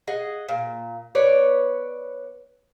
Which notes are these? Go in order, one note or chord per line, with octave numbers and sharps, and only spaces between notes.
G#4 D#5 F#5
A#2
B3 B4 C#5 D5